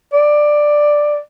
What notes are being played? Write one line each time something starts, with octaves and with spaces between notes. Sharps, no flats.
D5